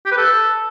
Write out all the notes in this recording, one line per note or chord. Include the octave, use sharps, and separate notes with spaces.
G4
B4
A4